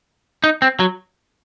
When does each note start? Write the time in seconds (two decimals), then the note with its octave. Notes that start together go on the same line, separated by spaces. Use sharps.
0.44 D#4
0.62 C4
0.80 F#3